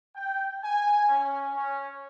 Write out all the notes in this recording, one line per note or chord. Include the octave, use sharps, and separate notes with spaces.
G5
G#5
C#4
C#4